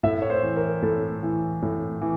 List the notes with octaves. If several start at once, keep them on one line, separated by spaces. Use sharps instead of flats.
A2 E5
C#5
C5
E3
A#4
A2 A4
E3
A2
E3